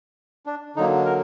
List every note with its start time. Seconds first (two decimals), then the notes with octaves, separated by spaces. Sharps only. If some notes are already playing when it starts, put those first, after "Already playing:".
0.46 D4
0.76 D3 F#3 A#3 D#4
1.05 A#4